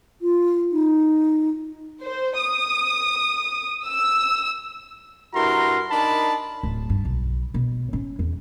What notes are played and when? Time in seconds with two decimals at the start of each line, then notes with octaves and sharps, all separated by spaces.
0.22 F4
0.72 D#4
2.00 C5
2.38 D#6
3.86 E6
5.34 G2 E4 F#4 A#4 A#5 C6
5.91 D4 D#4 A#4 A5 B5
6.63 D1
6.90 G2
7.05 B1
7.54 B2
7.93 C#4
8.19 E2